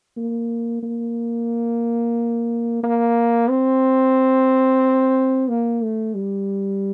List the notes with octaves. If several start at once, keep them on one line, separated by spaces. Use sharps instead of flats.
A#3
A#3
A#3
C4
A#3
A3
G3